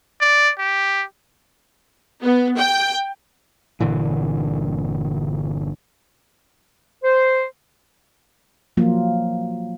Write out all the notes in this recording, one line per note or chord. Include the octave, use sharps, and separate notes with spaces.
D5
G4
B3
G5
G1 A#2 D3 E3
C5
F3 F#3 A#3 F4